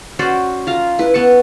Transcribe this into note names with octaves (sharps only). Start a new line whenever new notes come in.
C#4 F#4 C5 D5
F4 F5 A#5
E4 B4
B3 A5 C#6